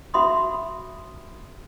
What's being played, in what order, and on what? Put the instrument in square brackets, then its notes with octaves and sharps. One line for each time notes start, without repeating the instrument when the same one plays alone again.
[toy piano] F#4 E5 B5 C6 D#6